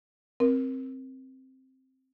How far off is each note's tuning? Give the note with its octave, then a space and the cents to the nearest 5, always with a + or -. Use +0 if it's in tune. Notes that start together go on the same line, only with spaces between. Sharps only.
C4 +5 A#4 +20